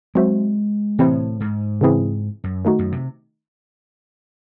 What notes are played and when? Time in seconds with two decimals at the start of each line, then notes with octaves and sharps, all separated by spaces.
0.15 F#3 G#3 C4 F#4 C5 E5
0.99 A2 C3 E3 C4 E4 C5
1.40 G#2
1.81 C#3 E3 C4 E4 G#4
2.44 F#2
2.65 D#3 A3 D#4 F#4
2.79 F#2
2.92 C3